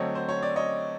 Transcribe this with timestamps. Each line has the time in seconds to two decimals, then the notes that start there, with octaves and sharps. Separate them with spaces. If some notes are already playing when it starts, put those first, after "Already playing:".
Already playing: D3 F#3 A3 C4 C#5 D#5
0.15 C5
0.29 C#5
0.42 D5
0.56 C#5 D#5